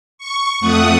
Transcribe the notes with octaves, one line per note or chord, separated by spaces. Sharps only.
C#6
F2 A3 F#5 D#6